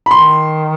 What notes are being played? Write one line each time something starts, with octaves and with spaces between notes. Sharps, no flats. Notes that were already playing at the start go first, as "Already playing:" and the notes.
B5
D#3 C6